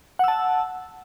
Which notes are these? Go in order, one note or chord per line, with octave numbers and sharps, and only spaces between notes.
F#5 A5 E6